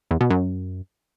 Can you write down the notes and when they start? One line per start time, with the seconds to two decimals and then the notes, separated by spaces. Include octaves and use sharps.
0.11 E2
0.21 B2
0.30 F#2